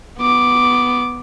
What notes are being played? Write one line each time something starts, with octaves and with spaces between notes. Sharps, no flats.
B3 D6